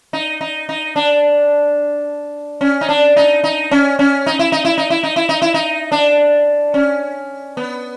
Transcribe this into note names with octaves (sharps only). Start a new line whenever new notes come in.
D#4
D#4
D#4
D4
C#4
D#4
D4
D#4
D#4
C#4
C#4
D#4
E4
D#4
E4
D#4
E4
D#4
E4
D#4
E4
D#4
D4
C#4
B3